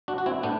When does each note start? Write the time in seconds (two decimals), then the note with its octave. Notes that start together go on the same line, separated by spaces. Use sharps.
0.08 D4 F#4
0.18 F#4
0.26 C4 E4
0.43 A2 B3 D4